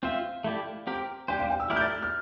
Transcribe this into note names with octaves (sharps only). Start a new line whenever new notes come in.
C4 F4 C5 E5 F5
A3 E4 G4 D5
C4 G4 A#4
G3 D4 G4 C5 G5
F5
G5
E6
A3 E4 A#4 D5 F6
G6
A6
F6